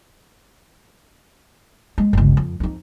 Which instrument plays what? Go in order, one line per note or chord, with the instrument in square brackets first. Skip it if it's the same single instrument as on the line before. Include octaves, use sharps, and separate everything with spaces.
[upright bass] G#3
G1 C#2
F2
F2 D#4